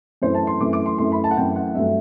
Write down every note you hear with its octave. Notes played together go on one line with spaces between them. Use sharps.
F#2 E3 A3 C5
A5
C6
F#2 E3 A3 D6
D6
C6
F#2 E3 A3 C6
B5
A5
F#5
F#2 E3 A3 G5
F#5
G2 F#3 A3 E5